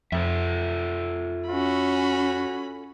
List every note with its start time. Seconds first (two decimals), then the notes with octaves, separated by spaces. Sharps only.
0.12 F2 F4 A4 E5
1.49 C#4 F#4 B5